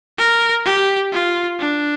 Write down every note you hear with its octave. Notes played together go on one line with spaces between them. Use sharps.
A#4
G4
F4
D4